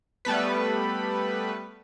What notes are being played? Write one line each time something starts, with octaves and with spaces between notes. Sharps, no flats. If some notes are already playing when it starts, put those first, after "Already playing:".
G3 A3 B3 B4